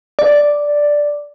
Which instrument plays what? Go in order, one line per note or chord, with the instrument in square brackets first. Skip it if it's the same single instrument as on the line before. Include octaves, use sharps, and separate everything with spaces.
[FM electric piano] D5